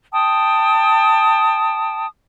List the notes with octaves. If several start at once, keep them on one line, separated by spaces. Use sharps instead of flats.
G5 A5 D#6